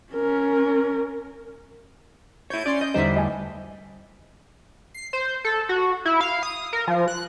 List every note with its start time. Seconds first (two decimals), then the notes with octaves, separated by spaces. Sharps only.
0.13 C#4 A#4
2.50 E4 C#5 G6 G#6 D#7
2.66 C#4 D5 C6
2.81 D#5 G6
2.94 E2 D3 G3 D#4 C5 E5
3.16 A2 D#5 G#5
4.94 C7
5.13 C5
5.45 A4
5.69 F#4
6.05 E4
6.21 F5
6.43 D#6
6.73 A#4
6.88 F3
7.08 F#6